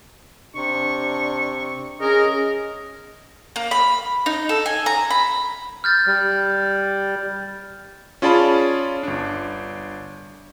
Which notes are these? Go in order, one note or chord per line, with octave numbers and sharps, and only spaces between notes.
C3 D4 C#6
C#4 G#4 A#4 D#5
A#3
B5
D#4
A4
G#5
A#5
B5
F6 G6 A6
G3
C#4 F4 G#4 D5 A5 B5
G1 D4